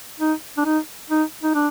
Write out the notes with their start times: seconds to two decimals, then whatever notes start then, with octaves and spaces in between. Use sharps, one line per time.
0.20 D#4
0.57 D4
0.65 D#4
1.10 D#4
1.43 D#4
1.54 D4